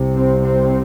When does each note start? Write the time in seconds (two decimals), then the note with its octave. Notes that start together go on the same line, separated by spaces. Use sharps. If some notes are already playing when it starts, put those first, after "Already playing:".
Already playing: C2 C3
0.14 C4
0.42 C4